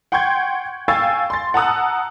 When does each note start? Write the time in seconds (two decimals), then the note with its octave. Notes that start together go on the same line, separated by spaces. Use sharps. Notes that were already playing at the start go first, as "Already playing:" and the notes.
0.12 F#5 G5 C6 C#6 G6 G#6
0.88 F5 G5 G#5 C#6 E6 A6
1.30 C6 A6
1.54 F#5 A5 A#5 D#6 E6 F#6